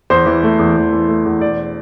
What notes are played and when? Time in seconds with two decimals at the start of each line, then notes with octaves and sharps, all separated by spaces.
0.10 E2 C5
0.26 E3
0.43 A3
0.59 E2
0.76 E2
0.92 E3
1.08 A3
1.25 E2
1.41 E1 D5